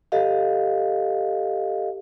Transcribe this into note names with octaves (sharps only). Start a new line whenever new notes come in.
G4 A4 D#5 F5